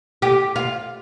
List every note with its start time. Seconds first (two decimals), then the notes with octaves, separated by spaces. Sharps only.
0.22 G4
0.56 F4